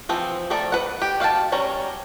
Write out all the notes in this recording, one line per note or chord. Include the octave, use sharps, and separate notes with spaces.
E3 F3 C4
F3 A3 A4 D5 A#5
B4 F#5
G4
F#4 F5 G5 A5
G3 C#4 C#5 A#5